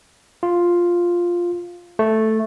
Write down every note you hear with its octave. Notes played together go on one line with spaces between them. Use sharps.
F4
A3